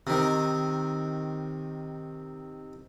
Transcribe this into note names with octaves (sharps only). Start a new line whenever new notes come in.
C3 D#3